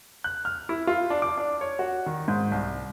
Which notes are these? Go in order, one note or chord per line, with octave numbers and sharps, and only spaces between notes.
F#6
F6
E4
F4
D4
D6
D4
C#5
F#4
D#3
G#2
C2